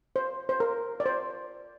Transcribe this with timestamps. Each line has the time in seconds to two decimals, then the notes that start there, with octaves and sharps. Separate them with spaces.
0.16 C5
0.49 C5
0.60 A#4
1.00 D5
1.06 C5